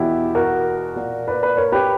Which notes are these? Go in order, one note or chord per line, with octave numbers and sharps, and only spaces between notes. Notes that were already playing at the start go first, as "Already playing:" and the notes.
Already playing: E2 B2 E4 G4
F#4 A#4
A#2
B4 D5
B4 D5
A#4 C#5
G4 B4